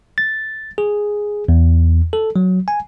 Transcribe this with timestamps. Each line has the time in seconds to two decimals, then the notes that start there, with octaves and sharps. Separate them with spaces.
0.18 A6
0.78 G#4
1.49 E2
2.13 A4
2.36 F#3
2.68 G#5